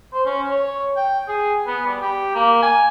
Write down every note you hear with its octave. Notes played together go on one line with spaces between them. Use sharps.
C5
C#4
C#5
G5
G#4
B3
G3
G4
A#3
G#5